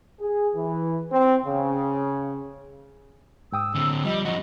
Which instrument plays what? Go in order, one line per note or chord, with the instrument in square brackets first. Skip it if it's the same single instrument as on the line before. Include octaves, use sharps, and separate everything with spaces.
[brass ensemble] G#4
E3
C4
C#3
[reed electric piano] G#2 G5 D#6 [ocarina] E6
[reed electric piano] A2 [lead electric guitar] D3 C4
[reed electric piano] F3 [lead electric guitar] G3 [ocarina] D#5
[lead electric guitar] F2 F#4 [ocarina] D#5